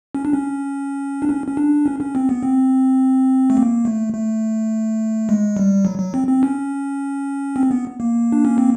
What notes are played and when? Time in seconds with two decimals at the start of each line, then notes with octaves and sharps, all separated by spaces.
0.15 C#4
0.25 D4
0.33 C#4
1.22 D4
1.29 C#4
1.48 C#4
1.57 D4
1.86 C#4
2.00 C#4
2.15 C4
2.29 B3
2.43 C4
3.50 A3
3.57 A#3
3.85 A3
4.14 A3
5.29 G#3
5.57 G3
5.85 F#3
5.99 F#3
6.14 C4
6.28 C4
6.43 C#4
7.56 C4
7.71 B3
8.00 A#3
8.32 D4
8.45 C#4
8.58 C4